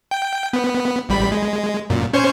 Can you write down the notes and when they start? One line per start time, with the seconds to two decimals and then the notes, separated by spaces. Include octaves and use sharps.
0.11 G5
0.53 B3
1.09 A1 G3 B5
1.32 G#3
1.90 F#2 A#2
2.13 C#4 C5 C#5